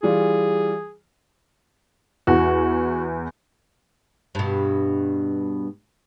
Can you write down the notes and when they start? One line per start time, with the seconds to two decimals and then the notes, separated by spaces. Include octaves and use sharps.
0.03 E3 G3 F4 G#4
2.27 E2 F#4
4.35 G2 B2